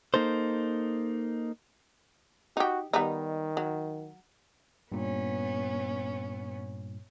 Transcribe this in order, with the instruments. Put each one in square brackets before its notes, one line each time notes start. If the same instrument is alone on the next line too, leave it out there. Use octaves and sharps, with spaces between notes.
[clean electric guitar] A#3 D#4 A4 C5
[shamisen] D#4 G4 [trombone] F#4
[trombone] D#3 [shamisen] G3 B3 D#4
[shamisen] F#3
[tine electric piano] G2 A#2 [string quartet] B3 C#4